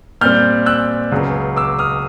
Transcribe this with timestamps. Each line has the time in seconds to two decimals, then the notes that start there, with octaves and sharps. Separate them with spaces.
0.21 A#2 G3 C4 F6 G6
0.66 E6 F#6
1.12 C#2 C#3 F#3 B3
1.57 D6 E6
1.79 D#6 F6